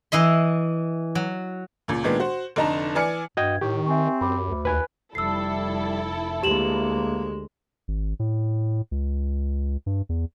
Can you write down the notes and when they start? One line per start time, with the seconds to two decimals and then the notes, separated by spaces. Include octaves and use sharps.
0.12 E3 E4 D#5 C6
1.15 F#3
1.88 C#2 A#2
2.03 A#2 D#3 G#3 B3 D4
2.20 F#4 C5
2.56 F1 D3 D#4 A5 A#5
2.95 E3 D5 G#5 F6 C#7
3.37 G2 F#4 D#5 G5 G#6
3.61 A2 D#3 G4 C#6
3.86 C4 E5 G#5 C#6
4.21 F#2 B5 D6
4.47 D2
4.65 D#2 B4 G#5 B5 F#6
5.15 F1 G3 E4 A4 E6 C7
6.43 D2 G#3 A#3 G4 E7 F#7
7.88 G#1
8.19 A2
8.91 C#2
9.86 G2
10.09 E2